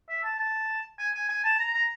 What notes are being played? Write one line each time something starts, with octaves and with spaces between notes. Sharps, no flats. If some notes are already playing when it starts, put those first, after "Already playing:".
E5
A5
A5
G#5
G#5
G#5
A5
A#5
A#5